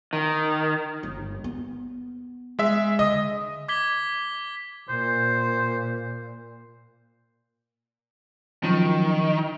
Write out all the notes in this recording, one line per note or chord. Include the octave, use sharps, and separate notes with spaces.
D#3
G1
B3
G#3 E5
D3 D#5 D#6
D6 G#6 B6 G7
A#2 C5
D#3 F3 F#3 C#4